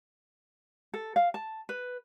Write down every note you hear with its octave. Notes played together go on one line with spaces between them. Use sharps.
A4
F5
A5
B4